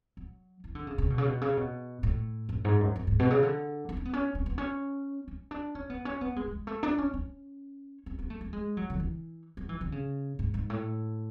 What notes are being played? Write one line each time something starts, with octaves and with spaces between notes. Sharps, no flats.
F#3
E3
D3
C#3
C#3
B2
C#3
B2
C#3
B2
A2
F#2
G#2
F#2
F#2
G#2
B2
C#3
D3
D4
C#4
B3
C#4
C#4
B3
C#4
C#4
D4
C#4
B3
C#4
B3
G#3
F#3
G#3
A3
D4
C#4
C#4
C#4
B3
A3
A3
G#3
F#3
D3
E3
F#3
E3
D3
C#3
G#2
G#2
A2